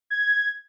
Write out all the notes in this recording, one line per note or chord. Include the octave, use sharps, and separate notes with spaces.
G#6